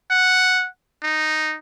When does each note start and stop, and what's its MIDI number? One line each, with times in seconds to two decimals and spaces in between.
0.10 0.68 78
1.02 1.56 63